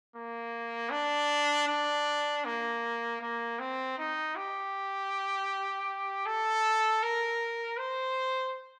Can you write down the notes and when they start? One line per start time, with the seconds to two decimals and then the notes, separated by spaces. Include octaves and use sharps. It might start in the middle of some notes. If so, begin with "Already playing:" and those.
0.16 A#3
0.91 D4
1.68 D4
2.45 A#3
3.21 A#3
3.59 C4
3.98 D#4
4.36 G4
6.26 A4
7.03 A#4
7.79 C5